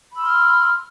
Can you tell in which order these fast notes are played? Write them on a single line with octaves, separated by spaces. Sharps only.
B5 E6 C6 F6